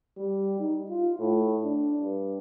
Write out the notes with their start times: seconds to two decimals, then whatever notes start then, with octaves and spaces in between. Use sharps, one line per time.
0.18 G3
0.60 D#4
0.89 F4
1.19 A2
1.64 D4
2.00 G2